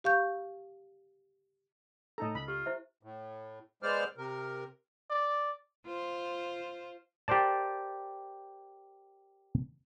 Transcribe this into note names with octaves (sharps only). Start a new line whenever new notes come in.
G4 F5 C#6 G6
A2 D#4 A4 D#5 A#5
C#2 B5
F4 G4
E4 C5 E5
A2
G#3 B3 C5 D5 F6
C3 A#4
D5
F4 C5
G4 A#4 C5 D5 A5